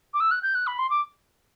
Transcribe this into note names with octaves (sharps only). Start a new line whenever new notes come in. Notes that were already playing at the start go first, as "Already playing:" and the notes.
D6
E6
F#6
G6
F#6
B5
C6
D6